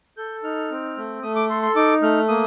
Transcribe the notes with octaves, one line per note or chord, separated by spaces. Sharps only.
A4 G6
D#4 F6
C4
A3
A3 D#6
D6
A4 C6
C6
D#4 D6
A3 F6
A#3 D#6